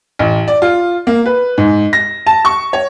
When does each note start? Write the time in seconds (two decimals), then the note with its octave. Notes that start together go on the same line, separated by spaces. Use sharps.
0.19 A1
0.48 D5
0.62 F4
1.07 A#3
1.26 B4
1.58 G#2
1.93 A#6
2.27 A5
2.45 C#6
2.73 C#5